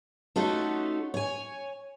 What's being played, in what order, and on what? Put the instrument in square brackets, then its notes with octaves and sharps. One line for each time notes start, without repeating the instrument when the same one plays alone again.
[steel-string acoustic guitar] A3 C#4 D#4 F4 F#4 A4
C#5 G#5